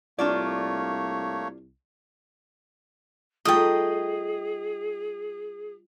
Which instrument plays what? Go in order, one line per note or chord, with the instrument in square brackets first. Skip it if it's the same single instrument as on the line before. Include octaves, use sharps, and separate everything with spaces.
[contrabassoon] C2 [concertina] A3 A#3 C#5 [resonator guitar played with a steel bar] D4 F4 D5
[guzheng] G3 A3 D#4 [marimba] F4 D#6 [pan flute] G#4 [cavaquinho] D#5 G5